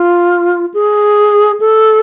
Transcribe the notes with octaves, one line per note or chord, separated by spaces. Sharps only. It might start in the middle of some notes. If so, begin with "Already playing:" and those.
Already playing: F4
G#4
A4